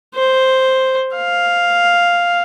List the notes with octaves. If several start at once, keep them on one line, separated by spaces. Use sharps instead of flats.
C5
F5